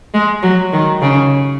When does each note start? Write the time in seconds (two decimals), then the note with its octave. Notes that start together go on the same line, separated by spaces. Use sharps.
0.14 G#3
0.43 F#3
0.73 D#3
1.02 C#3